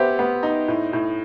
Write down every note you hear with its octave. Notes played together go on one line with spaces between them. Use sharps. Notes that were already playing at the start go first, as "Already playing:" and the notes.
Already playing: B3 G4 C5 E5
B3
D#4
A2
A2